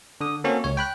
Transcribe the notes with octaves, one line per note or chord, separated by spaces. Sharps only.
D3 D#6
A#3 C4 C#4 F#4 A4
C#2 C#5
G5 B5 F#6